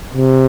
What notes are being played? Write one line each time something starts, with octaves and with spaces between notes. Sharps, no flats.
C3